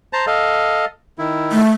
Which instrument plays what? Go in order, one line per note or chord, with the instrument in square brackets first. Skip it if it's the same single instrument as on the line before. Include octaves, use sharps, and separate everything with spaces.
[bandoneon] C5 A5 A#5
A4 D#5 F5
D#3 E4
[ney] A3